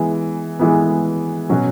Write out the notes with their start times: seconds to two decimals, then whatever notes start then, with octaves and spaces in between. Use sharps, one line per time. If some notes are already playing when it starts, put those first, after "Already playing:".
Already playing: E3 G#3 B3
0.59 E3 G#3 B3
1.49 B2 F#3 C#4 F#4